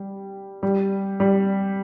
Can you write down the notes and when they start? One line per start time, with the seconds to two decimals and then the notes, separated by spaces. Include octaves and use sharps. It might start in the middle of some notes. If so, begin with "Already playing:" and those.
Already playing: G3
0.63 G3
1.20 G3